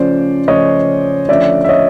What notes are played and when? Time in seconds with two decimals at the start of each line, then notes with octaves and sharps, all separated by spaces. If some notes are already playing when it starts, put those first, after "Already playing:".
Already playing: C#3 F3 A3 C#4 C5 D5
0.48 C#3 F3 A3 C#4 C#5 D#5
1.28 D3 F3 A3 C#4 D5 E5
1.64 E5
1.69 C#5 D#5